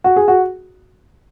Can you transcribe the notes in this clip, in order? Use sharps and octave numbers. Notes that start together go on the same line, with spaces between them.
F#4
G#4
F#4